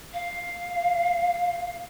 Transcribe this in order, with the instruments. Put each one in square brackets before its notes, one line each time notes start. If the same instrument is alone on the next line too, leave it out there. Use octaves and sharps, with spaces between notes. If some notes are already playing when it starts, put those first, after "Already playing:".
[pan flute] F5